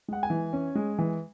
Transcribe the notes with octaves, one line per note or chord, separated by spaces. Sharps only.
G#3 F#5
G#5
E3
C#4
G#3
E3